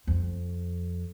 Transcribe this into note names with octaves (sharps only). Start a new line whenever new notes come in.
F2